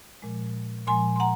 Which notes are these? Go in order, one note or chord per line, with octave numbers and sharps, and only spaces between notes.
A#2 F3 G#3
A#2 F3 G#3 G#5 C6
C6
F#5 A#5